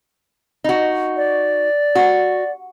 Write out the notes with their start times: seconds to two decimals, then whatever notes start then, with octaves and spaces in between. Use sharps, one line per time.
0.64 D#4 F#4
1.17 D5
1.95 F#4